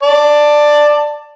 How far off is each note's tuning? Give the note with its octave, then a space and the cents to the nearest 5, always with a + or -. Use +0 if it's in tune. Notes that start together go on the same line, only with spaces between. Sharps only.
D5 +10 A5 +10